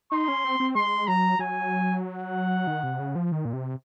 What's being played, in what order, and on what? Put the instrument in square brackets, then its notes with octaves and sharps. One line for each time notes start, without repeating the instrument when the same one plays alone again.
[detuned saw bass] D#4 [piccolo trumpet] C6
[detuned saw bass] C#4
C4
C4
[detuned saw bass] G#3 [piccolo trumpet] C6
[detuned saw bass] F#3 [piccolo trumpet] A#5
[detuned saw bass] F#3 [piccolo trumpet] G#5
[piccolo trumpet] F#5
[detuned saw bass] D#3
C3
C#3
F3
D#3
A#2
C3